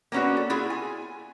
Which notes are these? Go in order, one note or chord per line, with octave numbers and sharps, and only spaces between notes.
A#3 B3 C#4 D4 F#4
A4
E4 F4 G#4
G#5